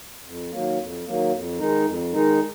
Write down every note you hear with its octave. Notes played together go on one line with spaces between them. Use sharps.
F2
D#3 F#3 A#3
F2
D#3 F#3 A#3
F2
D#3 G#3 D#4
F2
D#3 G#3 D#4